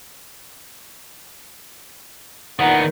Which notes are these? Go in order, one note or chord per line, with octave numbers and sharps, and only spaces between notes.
E2 A#2 D#3 B3 D#4 F#5